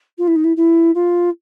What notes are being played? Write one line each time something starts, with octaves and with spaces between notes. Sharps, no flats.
F4
E4
D#4
E4
E4
F4